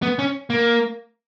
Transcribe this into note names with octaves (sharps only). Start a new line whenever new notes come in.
B3
C#4
A#3